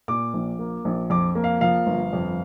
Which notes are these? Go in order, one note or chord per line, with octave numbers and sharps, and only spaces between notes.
A#2 D6
A#1
A#3
A#1
F2 D6
A#3
F5
F3 F5
G1
F2